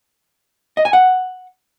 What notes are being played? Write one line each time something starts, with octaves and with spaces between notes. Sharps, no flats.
D#5
G#5
F#5